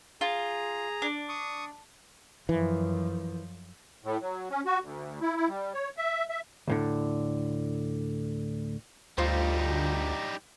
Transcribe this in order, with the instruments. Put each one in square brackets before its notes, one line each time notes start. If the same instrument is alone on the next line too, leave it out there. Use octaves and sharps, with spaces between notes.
[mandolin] F4 [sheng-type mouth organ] G#4 A#5
[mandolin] D4
[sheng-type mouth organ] C#6 D#6
[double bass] F#2 F3 [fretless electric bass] E3
[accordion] A2
F#3
C#4
F#4
D2
E4
E4
G3
C#5
E5
E5
[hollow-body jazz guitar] D2 A2 D3
[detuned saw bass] D2 [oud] G2 F4 C5 [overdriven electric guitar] G3 D#4